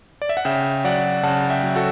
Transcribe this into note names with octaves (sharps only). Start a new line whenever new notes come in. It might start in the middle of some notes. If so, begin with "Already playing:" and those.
D5
E5
F#5
C#3 E5 G5
F#3 D5 F#5
C#3 F#5 A5
E5 G5
F#3
F#4 A4